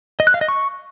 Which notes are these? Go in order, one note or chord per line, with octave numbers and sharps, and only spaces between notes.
D#5
F#6
F5
D#5
C#6